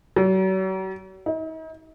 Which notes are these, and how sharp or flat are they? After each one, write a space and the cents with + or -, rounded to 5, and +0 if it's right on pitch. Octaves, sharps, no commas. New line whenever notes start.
F#3 +40
D#4 +40